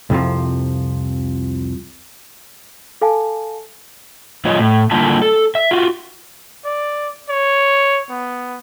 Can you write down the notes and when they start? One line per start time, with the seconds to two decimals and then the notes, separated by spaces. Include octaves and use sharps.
0.10 C2 F2 C3 F3
3.02 A4 F5 G#5 A5
4.45 F3 G3 F4 C#5 D#5
4.58 A2
4.91 D3 G3 A#3 E4 F4 A5
5.22 A4
5.55 E5
5.71 F4 F#4
6.65 D5
7.29 C#5
8.10 B3